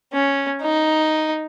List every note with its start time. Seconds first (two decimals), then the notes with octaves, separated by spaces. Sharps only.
0.13 C#4
0.62 D#4